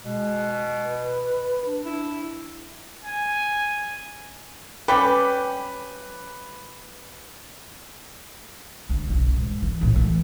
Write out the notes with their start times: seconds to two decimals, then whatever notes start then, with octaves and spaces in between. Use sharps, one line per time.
0.04 B2 G#3
0.85 B4
1.65 D4
1.85 D4 E4
3.03 G#5
4.88 G3 C#4 G4 B4 D6
8.89 D2
9.07 F#1 B1
9.37 G#2
9.62 E3
9.81 A#1 A2
9.96 E3 A3